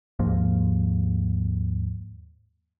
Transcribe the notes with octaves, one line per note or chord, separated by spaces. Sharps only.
D#2 G#2 F3 A#3